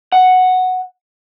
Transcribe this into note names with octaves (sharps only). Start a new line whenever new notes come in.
F#5